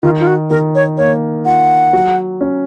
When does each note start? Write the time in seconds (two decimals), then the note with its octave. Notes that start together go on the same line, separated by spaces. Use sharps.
0.03 D#3 F4
0.20 F4
0.27 F#4
0.50 D#3 A#4
0.75 C#5
0.98 A#3 C#5
1.45 F4 F#5
1.93 F#3
2.41 C#4